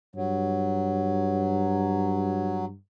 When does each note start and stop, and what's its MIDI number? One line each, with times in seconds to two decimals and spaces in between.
0.16 2.77 43
0.16 2.65 54